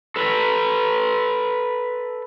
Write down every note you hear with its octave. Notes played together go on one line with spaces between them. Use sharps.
A4 B4